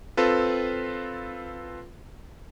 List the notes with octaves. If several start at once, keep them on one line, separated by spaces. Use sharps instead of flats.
C4 F4 A4 B4